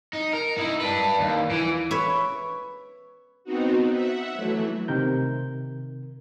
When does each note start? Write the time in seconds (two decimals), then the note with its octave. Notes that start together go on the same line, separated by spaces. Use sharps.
0.13 D#4
0.33 A#4
0.57 D#4 E4
0.81 D4 B4
1.20 D#2
1.50 E3
1.91 B4 C#5 E5
3.44 B3 C4 D#4 F#4
3.90 E5 F#5
4.35 E3 F#3 A3
4.88 C3 D#3 A#4 G6